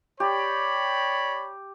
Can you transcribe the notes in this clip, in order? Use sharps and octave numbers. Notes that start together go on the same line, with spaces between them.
G4 C#5 D5 B5